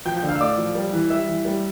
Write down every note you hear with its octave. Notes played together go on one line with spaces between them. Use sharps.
F3 G5 G6
G5 G6
D3
F5 F6
E6
A2 D5 D6
F3
G3
E3
G3 E5 E6
E3
G3